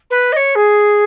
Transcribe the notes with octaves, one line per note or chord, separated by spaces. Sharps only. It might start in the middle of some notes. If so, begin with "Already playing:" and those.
B4
D#5
C#5
G#4